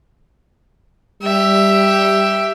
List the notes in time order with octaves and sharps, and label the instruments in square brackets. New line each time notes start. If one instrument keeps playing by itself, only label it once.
[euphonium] G3 [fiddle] G4 E5